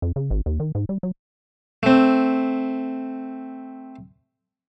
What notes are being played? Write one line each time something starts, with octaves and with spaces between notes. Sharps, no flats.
F2
C#3
G#1
D#2
D#3
G#2
G3
F#3
A3 C4